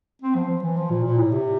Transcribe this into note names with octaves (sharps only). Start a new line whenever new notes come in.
C4
F3
F3
E3
F3
A#2
A#2
A2
C3